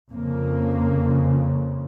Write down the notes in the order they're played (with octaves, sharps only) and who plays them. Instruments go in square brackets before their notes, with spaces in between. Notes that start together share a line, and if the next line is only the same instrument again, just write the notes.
[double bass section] F2 C#3 A#3